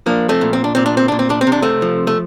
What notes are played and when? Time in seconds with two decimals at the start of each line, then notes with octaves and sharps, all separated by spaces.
0.06 F3 A#3 D4
0.29 A3 C4
0.41 A#2
0.53 C4
0.64 D4
0.75 A#2 C4
0.86 D4
0.97 C4
1.08 A#2 D4
1.19 C4
1.30 D4
1.41 C4
1.47 C3
1.52 D4
1.62 A3 C4
1.82 F3
2.07 A3